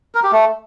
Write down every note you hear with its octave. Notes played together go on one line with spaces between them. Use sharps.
A#4
G4
A3